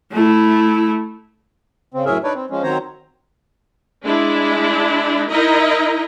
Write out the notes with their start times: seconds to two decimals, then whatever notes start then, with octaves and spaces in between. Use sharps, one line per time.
0.12 A3 E4
1.94 C#3 C4
2.06 F#2 A2 C#4 G#4 A#4 E5
2.24 D4 D#4 B4 C#5 D5
2.35 C4
2.50 F3 G#3 C#4
2.63 D#3 F#3 C4 C5 C#5 A#5
4.05 G#3 D4 E4
5.27 D#4 E4 A#4 D#5 A#5